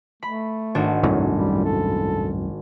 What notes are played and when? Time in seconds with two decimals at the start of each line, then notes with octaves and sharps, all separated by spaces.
0.23 A3 B5
0.75 G#1 D4 F#4
1.03 C2 F#2 A2 F#3
1.30 G3
1.65 A4